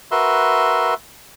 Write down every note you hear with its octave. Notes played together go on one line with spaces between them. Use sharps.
F#4 A#4 B4 E5 C6